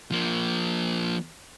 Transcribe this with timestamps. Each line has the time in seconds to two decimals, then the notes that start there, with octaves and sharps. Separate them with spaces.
0.12 F3 A#3